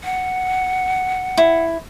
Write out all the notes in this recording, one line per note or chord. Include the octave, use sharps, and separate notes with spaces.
F#5
E4